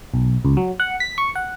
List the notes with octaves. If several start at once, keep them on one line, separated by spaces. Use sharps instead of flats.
B1
C#2
F#3
F#5
B6
C#6
F#5